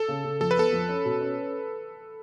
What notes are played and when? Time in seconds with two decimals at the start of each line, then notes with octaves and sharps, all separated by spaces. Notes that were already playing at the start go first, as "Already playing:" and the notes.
Already playing: A4
0.08 C#3
0.24 C#3
0.40 F2 A4
0.51 B4
0.57 B3 A4
0.73 F2
0.89 C#4
1.05 B2
1.21 C#4